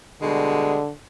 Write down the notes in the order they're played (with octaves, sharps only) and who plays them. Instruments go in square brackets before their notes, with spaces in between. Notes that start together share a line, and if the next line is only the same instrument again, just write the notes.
[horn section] B2 G3 G#3 [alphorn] D3